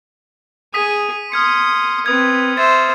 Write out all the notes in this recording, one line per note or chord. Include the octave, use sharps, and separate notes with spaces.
G#4 G#5 D#6 B6 D#7
C6 D#6 F6 G#6 C#7
C4 B4 D#6 G#6
C5 E5 A6